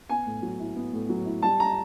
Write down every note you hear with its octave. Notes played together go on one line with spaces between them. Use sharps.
B3 G#5
A2
F#3
E4
B3
A2
F#3
E4
G3 A5
A#5